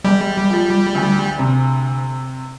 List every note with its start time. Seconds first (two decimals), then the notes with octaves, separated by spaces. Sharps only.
0.05 E1 G3
0.50 F3
0.95 D2
1.39 C3